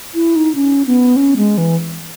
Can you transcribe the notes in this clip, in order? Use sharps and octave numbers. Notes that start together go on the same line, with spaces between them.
E4
D#4
C#4
B3
C#4
G#3
E3